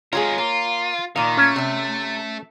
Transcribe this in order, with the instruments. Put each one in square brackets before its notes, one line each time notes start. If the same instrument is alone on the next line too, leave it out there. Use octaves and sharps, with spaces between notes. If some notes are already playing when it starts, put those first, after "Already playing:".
[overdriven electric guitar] G#3 A#4 [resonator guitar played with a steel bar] F4 G4 G#4 [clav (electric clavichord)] C#5
[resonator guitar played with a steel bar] A#3 [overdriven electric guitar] F4
[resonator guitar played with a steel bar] A#2 F5 [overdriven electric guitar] D#3
[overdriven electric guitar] A3 [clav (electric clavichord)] C#4
[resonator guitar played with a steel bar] C3 E5